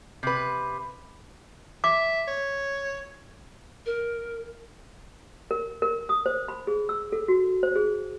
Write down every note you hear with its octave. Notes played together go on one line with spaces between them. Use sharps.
C3 B4
E5 D6
C#5
A#4
A#4
A#4
D#6
C5
B5
G#4
E6
A4
F#4
C5
G#4